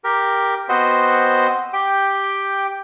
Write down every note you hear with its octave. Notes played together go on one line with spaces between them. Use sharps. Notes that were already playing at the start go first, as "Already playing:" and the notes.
G4 A#4
B3 C4 F#4 C5 D#5
G4 G5